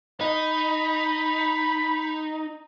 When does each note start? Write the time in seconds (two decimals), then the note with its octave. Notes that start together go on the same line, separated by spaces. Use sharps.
0.21 D#4 B5